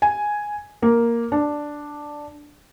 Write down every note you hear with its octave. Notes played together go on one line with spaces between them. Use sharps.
G#5
A#3
D4